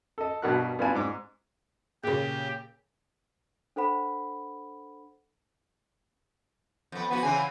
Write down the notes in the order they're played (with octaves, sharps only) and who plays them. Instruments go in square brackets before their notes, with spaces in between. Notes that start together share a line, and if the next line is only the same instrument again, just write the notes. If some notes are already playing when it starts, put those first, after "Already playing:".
[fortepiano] A4 D#5
G2 B2 D4 F#4 A#4 F#6
G2 B3 F4 D5 G#5 F#6
G#2 D6
[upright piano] A#2 C#3 [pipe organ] G4 [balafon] G#4 A#4
[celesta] D4 A4 C5 F#5 B5
[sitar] F2 B3
[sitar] F3 F#4 [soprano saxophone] B3
[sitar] C#3 E3 C4 [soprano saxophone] G#5